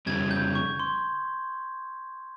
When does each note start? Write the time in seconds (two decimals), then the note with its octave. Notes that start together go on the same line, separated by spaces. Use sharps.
0.06 F2 C#3 G3 G#6
0.31 G6
0.55 C#6
0.80 C6